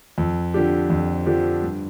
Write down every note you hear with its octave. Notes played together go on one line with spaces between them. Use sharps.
F2
D3 F3 D4 G4
F2
D3 F3 D4 G4
G2